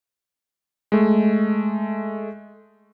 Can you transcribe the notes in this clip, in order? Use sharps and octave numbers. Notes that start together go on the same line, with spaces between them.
G#3 A3